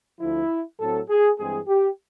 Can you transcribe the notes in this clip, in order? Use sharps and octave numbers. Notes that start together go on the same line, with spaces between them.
D2 D3 F3 E4
A2 F#3 A3 C4 A4
G#4
G2 E3 G#3 C4 G#4
G4